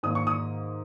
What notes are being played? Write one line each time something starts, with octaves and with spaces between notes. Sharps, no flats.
G#2 D#3 A#3 D#6
C#6
D#6